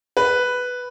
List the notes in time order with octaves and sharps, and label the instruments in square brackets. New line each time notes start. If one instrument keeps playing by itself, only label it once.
[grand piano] B4